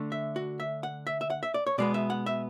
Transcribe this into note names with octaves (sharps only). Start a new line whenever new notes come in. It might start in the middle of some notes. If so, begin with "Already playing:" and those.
Already playing: D3 A3
E5
F#4
E5
F#5
E5
E5
F#5
E5
D5
C#5
B2 G#3 B3 D5
E5
F#5
E5